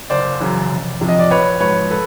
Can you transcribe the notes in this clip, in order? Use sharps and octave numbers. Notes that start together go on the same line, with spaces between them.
F#1 C5 D5
F#2 C#3 E3
F1
F2 C3 F3
D#5
D5
A#1 B4 C#5
G#2 F3 B4 C#5
A4 B4